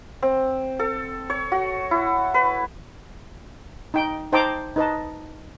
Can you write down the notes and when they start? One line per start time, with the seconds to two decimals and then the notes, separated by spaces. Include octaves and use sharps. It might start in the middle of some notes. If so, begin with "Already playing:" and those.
0.23 C4
0.79 A4
1.30 C#5
1.52 F#4
1.91 E4
2.34 B4
3.94 D#4 G5
4.32 D#4 C5 G5 A5 A#5 D6
4.76 D#4 B4 D#5 A5